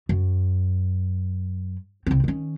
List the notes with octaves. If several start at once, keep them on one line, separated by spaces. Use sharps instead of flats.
F#2
C2 C4
D#3 C#4